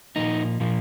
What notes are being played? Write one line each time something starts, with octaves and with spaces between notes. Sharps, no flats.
A#2 F3 A#3 D#4
A#2 F3 A#3